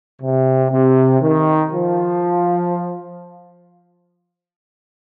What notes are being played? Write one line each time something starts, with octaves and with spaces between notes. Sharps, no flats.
C3
C3
D#3
F3